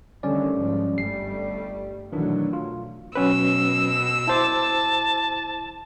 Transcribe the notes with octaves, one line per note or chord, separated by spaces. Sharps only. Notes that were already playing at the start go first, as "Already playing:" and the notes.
D3 D#3 G3 A3 C#4 D5
G#2 F3
G1 G3 A3 C7
B2 D#3 E3 F#3 A3 D4
F4
B2 F#3 C#4 B4 E6
E4 C5 A5 D6